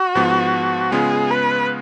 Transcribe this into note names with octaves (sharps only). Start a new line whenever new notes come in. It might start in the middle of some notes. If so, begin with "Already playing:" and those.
Already playing: F#4
G#2 F3 B3
C#3 G#3 B3 F4 G#4
B4